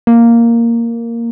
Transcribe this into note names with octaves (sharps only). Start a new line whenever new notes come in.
A#3